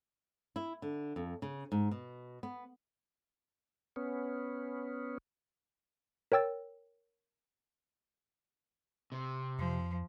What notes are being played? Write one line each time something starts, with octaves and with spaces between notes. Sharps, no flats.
E4
D3
F2
C#3
G#2
B2
B3
B3 C#4
A#4 C#5 G5 E6 A6
C3
F2 F3